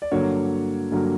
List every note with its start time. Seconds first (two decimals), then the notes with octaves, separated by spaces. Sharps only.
0.02 D5
0.12 G2 D3 F#3 A#3 C#5
0.91 G2 D3 F#3 A#3